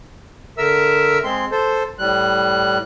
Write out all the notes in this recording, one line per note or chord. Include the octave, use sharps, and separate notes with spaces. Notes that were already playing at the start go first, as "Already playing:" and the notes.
D3 A#4 E5 E6
G#3 C4 C6
A4 C5
A2 G3 F#6